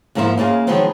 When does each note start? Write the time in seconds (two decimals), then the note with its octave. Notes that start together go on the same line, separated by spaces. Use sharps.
0.15 E2 G#2 F3 A#3 C5 E5
0.38 C#3 A#3 F4 G#4
0.67 D#3 F3 F#3 G#3 B3 C4